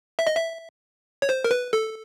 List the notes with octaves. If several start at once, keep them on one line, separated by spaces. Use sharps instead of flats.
E5
D#5
E5
C#5
C5
A#4
B4
A4